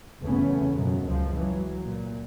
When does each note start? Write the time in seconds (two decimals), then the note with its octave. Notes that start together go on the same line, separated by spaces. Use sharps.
0.23 F#1 E2 C#3 A3 B3 C#4
0.74 F#2 B2 F3 F#3 G#3
1.05 C#2 F#2 F3
1.35 E3 F#3
1.81 A#2